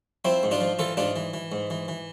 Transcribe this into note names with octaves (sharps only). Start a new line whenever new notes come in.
F3 C4 E4
G#2
D4 F4
F3
E3 F4 A4
G#2 D4 F4
E3
E3
G#2
E3
E3